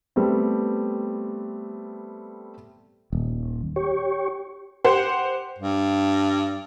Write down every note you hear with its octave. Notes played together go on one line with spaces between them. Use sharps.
G3 A3 B3 C4
D#1
G4 C#5
G4 C5 F#5
G2